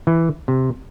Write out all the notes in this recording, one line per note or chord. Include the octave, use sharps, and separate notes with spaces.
E3
C3